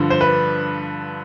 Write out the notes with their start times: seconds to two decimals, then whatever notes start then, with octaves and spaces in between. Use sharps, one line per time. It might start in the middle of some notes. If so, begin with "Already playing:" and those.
Already playing: G2 D3 F3
0.10 C5
0.21 B4